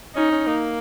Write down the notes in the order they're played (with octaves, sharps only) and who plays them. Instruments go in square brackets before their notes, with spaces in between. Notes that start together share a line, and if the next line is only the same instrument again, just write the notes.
[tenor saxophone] C#4 [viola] D#4
[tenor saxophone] C#4
A#3